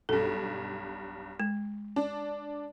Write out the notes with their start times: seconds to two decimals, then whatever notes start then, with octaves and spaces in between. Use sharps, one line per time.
0.09 B1 G2 A4
1.40 G#3
1.96 D4